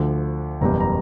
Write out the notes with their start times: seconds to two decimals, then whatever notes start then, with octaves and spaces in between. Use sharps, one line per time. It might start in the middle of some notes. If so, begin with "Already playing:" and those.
Already playing: D2 D3 F3
0.61 F#1 E2 B2 G3 A#5
0.80 A#5